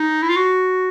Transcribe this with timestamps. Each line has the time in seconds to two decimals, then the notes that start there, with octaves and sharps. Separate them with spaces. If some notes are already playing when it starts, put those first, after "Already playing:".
Already playing: D#4
0.22 E4
0.29 F4
0.36 F#4